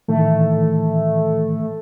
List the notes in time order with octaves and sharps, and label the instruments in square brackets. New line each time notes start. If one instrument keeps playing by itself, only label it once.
[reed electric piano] A2 D#3 E3 [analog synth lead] A3